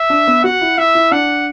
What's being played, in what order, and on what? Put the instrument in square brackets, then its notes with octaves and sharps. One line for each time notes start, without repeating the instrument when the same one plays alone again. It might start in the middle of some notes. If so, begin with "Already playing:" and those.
Already playing: [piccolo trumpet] E5
[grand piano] D4
B3
[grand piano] F#4 [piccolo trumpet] F#5
[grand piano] E4
[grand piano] E4 [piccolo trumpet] E5
[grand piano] E4
[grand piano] D4 [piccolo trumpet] F#5